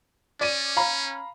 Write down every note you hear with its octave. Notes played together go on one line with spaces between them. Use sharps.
C#4 D5 D#7
F5 A#5 B5